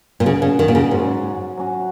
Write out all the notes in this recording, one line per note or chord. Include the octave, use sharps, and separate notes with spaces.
A#2
C#3 F#3 C#4 F#4
C#3
D#3
A#2
C#3
G#2 F#3 C#4 F#4
F#3 C#4 F#4